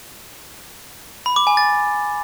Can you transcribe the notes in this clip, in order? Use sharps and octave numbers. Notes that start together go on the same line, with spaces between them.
B5
D6
G#5
A6